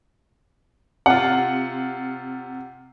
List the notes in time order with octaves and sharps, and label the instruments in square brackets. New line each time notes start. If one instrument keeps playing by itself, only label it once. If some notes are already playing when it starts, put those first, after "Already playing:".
[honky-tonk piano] C3 F4 [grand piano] F#5